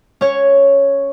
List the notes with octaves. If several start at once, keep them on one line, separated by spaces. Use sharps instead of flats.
C#4 C#5